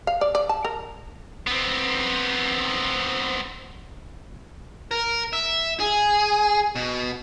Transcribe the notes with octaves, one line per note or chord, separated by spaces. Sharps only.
F5
D5
D5
A5
A#4
B3 C4
A#4
E5
G#4
B2